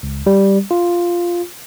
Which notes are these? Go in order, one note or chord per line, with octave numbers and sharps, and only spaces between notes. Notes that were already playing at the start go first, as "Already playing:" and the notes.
C#2
G3
F4